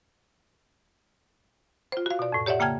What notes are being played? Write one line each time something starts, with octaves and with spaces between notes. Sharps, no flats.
F4 C5
F#4 F5
B2 D5
F2 A2
G4 C#5 D5 E5 F#5
C#3 A#3 G5 A5 F6 G#6